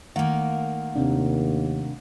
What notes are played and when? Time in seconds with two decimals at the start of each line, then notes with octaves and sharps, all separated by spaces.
0.16 D#3 A3 A#3 F5 F#5
0.95 D#2 C3 D4